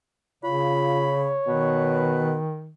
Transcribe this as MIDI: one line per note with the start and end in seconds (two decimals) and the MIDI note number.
0.44 1.38 49
0.44 1.13 65
0.44 2.28 73
0.44 1.33 83
1.48 2.39 47
1.48 2.73 51
1.48 2.37 71